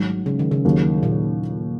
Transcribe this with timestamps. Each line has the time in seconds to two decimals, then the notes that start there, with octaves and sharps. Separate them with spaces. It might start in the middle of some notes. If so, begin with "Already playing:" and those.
Already playing: G#1 G#2 F#3
0.26 C#3
0.39 D#3
0.51 C#3
0.65 D#2 D#3 F#3 D#4
1.03 A#2